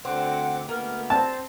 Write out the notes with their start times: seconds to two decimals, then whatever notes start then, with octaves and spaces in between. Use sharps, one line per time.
0.05 D2 D3 C4 F#5 D6
0.69 D2 A#3 B3 A#4
1.10 C4 A5